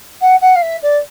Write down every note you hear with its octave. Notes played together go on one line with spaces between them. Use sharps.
F#5
F#5
F5
E5
D5